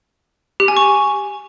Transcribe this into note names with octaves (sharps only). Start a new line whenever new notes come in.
G4
G#5
C#6